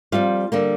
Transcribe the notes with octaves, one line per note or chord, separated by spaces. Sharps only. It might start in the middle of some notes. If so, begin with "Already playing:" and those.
F2 C3 G3 F4 F5
D3 G3 A#3